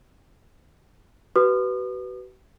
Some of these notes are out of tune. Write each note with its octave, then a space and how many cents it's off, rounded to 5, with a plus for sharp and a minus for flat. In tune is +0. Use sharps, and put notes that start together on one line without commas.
F#4 +40 B4 +0 D#6 -40